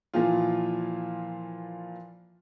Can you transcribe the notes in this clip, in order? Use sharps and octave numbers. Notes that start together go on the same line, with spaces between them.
A#2 E3 F3 F4